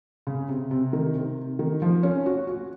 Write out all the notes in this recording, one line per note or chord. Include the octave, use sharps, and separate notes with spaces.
C#3
C3
C3
D#3
C3
D#3
F3
C#4
F#4
F#4